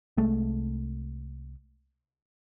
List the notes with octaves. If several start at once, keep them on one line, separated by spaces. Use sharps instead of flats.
C2 G#3 A3